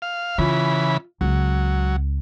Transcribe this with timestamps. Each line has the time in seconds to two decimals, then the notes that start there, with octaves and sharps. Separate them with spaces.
0.02 F5
0.38 C#3 E3 F4 B5
1.21 C#2 F#3